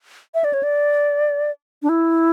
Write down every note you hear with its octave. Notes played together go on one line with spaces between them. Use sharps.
E5
D5
C#5
D5
D4
E4